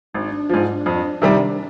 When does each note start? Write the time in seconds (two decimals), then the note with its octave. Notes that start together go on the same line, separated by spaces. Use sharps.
0.13 G#1 D4
0.50 G#2 F3
0.86 F2
1.22 C3 D#3 G3